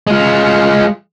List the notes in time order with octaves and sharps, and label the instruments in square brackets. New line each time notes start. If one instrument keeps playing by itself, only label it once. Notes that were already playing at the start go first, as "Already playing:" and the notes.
[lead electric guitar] G#3 F4